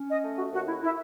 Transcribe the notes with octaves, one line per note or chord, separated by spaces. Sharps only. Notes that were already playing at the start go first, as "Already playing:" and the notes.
Already playing: C#4
D#5
A3
F#4
D#2 F#4
E4
E4